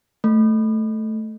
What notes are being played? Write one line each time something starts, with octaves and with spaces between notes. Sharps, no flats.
A3